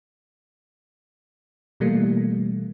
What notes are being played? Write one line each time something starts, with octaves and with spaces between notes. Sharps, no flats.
B2 E3 G3 A3 A#3